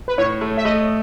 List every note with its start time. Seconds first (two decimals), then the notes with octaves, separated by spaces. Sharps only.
0.08 B4
0.18 A2 C#5
0.41 A3
0.57 E5
0.65 A3 D#5